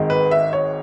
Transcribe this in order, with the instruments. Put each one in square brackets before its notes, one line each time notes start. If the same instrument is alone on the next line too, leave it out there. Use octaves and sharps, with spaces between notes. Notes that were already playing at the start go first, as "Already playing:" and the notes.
Already playing: [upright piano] G#1 G#2 D#3 G#3
B4
E5
C#5